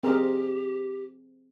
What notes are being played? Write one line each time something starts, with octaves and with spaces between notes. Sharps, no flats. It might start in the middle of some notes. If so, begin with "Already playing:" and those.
C4 G4 G#4 A#4